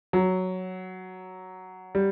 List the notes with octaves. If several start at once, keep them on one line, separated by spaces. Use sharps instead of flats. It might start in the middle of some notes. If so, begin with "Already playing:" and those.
F#3
G3